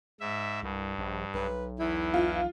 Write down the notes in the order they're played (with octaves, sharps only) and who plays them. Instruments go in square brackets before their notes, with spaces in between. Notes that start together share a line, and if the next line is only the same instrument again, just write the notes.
[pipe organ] G#2 E5
[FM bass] C2 [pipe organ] G2
[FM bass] A#1
[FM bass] B1 [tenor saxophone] B4
[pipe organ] E2 E3 [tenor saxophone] E4
[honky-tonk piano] F4